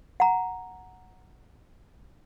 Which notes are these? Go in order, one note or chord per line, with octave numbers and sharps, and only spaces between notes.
F#5 A#5